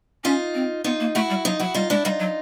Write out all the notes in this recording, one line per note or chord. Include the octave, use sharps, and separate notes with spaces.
C#4 D#4 F4
C4
B3 D#4 F4
A#3
A3 E4 F#4
G3
F#3 D#4 F4
F#3 E4 F#4
G3 D#4 F4
G#3 D4 E4
G3 D#4 F4
F#3